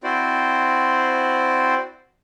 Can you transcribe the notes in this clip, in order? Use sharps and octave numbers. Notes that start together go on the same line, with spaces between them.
C4 E4 F#4 C5 D5